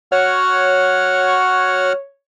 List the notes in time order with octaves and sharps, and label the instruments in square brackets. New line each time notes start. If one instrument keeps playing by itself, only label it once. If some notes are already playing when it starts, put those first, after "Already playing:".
[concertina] F#4 F#5 F6 [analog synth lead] C#5